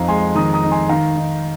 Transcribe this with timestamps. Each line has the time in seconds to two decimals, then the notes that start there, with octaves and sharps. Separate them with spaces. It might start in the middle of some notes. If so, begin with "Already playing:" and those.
Already playing: F2 D#4 F5 A#5
0.08 G#3 G#5 C6
0.35 D#3 A#5 D#6
0.53 A#5 D#6
0.63 D#4
0.71 G#5 C6
0.89 D#3 F5 A#5
1.16 D#4